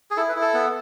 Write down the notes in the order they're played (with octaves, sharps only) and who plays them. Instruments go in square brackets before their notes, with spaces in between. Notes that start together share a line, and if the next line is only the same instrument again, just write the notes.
[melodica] G#4
E4 A4
B4
E4
A4
B3